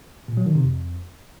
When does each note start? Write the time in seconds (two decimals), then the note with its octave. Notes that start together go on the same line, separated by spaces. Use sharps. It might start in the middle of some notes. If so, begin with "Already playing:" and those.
0.28 A#2
0.37 F#3
0.46 D#3
0.55 C3
0.64 F2